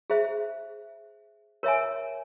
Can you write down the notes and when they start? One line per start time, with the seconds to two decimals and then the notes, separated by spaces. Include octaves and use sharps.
0.10 G#4 C5 E5
1.63 A#4 C#5 E5 G#5